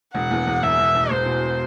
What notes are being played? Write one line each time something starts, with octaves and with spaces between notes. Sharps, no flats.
E1 F#5
E2
E1
E1 E5
E1
E1
E1 C5
B2